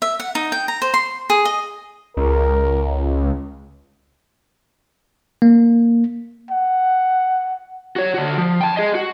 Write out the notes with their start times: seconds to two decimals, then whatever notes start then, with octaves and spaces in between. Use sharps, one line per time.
0.02 E5
0.20 F#5
0.35 D#4
0.52 G5
0.68 A#5
0.82 C5
0.94 C6
1.30 G#4
1.45 D#5
2.17 C#2 A#4
5.42 A#3
6.51 F#5
7.96 F#4 C#5
8.14 D3 F#4
8.38 F3
8.61 G5 A5
8.77 G#4 D#5
8.95 F#4